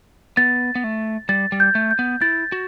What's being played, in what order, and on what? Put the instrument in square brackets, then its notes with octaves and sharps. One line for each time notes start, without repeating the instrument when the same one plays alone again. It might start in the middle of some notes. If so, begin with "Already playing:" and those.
[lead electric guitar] B3 [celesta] A6
[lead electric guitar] B3
A3
[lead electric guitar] G3 [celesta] A6
[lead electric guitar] G3
[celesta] G6
[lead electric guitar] A3
[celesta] G6
[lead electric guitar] B3
[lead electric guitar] E4 [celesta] A6
[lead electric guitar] F#4